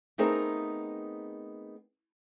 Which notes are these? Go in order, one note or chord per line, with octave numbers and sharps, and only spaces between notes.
A3 B3 C4 D#4 G#4 A#4